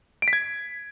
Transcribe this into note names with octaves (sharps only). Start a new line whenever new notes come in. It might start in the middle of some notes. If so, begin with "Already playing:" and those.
D7
B6
G#6